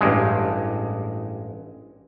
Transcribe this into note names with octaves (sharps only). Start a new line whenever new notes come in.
A1 G2 G#3